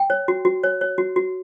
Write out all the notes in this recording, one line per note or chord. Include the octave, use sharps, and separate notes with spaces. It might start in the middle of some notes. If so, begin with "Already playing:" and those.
Already playing: G5
C#5
F#4
F#4
C#5
C#5
F#4
F#4